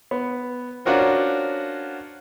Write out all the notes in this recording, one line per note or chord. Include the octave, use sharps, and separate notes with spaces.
B3
C#4 D4 F4 F#4 A#4 C5